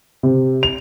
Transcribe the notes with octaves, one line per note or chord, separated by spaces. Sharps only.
C3
F7